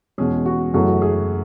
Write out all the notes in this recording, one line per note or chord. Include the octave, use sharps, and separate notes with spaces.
E2 B2 G#3 C#4 G#4
F#4
F#2 C#3 E3 A3 F#4
F#4
G#4